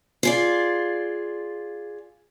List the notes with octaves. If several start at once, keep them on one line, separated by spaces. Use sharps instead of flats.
F4 G#4 D5